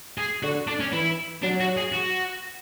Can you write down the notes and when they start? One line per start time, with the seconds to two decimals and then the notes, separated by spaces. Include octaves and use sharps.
0.18 G#4
0.43 D3 F#4
0.67 D4
0.80 C#4
0.92 E3 E4
1.42 F#3 D4
1.60 F#4
1.77 G#4
1.92 F#4